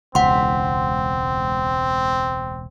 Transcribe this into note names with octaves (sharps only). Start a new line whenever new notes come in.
E1 C#2 C4 F#5 C6